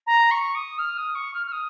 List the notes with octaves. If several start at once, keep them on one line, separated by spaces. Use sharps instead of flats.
A#5
C#6
D#6
F6
D#6
C#6
F6
F6
D#6